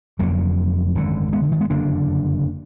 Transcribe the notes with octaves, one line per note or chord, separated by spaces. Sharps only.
F1 F2 D3 F#3 A#3
G#1 F#2 D3
G#3 B3
D3
D#3
G#3 B3
F#1 F2 D3 A#3 D4